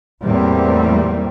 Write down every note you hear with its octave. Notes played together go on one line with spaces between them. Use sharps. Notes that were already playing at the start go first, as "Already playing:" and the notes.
E2 A2 G3 A#3 C4